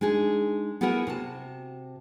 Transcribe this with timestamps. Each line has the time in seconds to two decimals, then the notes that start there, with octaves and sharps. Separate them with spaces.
0.01 G#3 D4 D#4 G#4
0.81 B3 E4 F#4 G#4 A#4 F#5
1.07 C3 F#4 A5